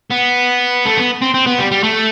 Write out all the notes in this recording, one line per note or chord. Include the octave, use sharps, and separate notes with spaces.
B3
A3
B3
C4
C4
B3
G3
G3
A3